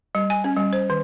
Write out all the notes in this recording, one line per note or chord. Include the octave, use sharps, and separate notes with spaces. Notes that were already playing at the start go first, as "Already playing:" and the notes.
G3
G#5
C#4
G3
C5
D#3